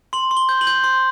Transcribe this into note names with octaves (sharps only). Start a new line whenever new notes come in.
C6 F#7
C6
G7
G6
F#7
G6
C6